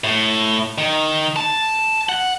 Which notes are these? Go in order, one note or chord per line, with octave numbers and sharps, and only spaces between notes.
A2
D#3
A5
F#5